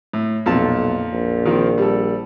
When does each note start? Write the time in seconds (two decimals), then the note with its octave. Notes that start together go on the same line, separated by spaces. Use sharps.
0.13 A2
0.46 B1 F2 A#2 A5
1.13 A#1
1.46 D#3 F3 C4
1.78 G3 A4